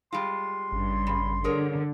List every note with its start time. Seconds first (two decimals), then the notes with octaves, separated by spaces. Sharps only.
0.13 G3 G#3 F4 C6
0.72 G#1 G2 C#3
1.07 G3
1.44 D3 G#4 A#4 C#5